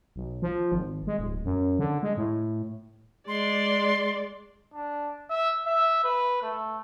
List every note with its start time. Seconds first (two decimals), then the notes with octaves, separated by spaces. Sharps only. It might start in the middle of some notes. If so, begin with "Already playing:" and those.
0.16 B1
0.42 F3
0.72 G#1
1.07 G#3
1.18 D1
1.45 F#2
1.79 D3
2.03 G#3
2.17 A2
3.28 G#3 D5 C6
4.74 D4
5.30 E5
5.66 E5
6.04 B4
6.42 A3